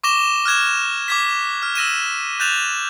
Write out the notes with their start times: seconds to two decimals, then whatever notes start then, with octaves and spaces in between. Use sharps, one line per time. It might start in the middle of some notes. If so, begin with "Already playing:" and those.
0.04 C#6 D6 A#6 E7 G7
0.45 F6 F#6 G#6 E7
1.08 D6 G#6 B6
1.63 F6
1.75 E6 A#6 D#7 E7
2.40 F#6 G6 A6 E7 F7